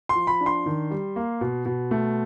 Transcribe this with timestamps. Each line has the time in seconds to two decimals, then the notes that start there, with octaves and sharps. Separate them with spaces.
0.09 C6
0.15 F3
0.27 B5
0.41 D4
0.46 C6
0.66 D#3
0.91 G3
1.16 A#3
1.41 B2
1.66 B2
1.91 A3